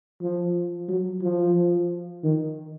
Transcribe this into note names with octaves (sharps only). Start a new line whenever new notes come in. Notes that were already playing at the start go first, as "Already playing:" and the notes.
F3
F#3
F3
D#3